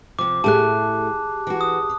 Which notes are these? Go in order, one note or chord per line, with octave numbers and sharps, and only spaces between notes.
C3 F3 D6
A2 A3 G4 G#4 A5 F#6
E3 F#4
D#6